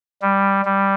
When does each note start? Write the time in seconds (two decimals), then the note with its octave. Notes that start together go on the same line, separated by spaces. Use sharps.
0.22 G3
0.65 G3